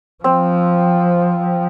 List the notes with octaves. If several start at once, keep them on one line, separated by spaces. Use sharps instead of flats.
F3 C4